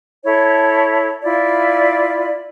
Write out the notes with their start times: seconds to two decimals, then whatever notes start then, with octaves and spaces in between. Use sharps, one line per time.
0.24 E4 A4 C#5
1.23 E4 F4 D5